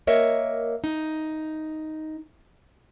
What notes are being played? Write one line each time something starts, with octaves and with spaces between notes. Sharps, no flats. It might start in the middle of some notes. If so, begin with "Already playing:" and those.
A#3 A#4 C#5 D#5 E5
D#4